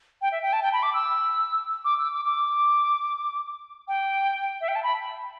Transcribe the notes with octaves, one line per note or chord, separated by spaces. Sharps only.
G5
E5
G5
A5
G5
B5
D6
E6
D6
E6
D6
D6
G5
E5
G5
A5
B5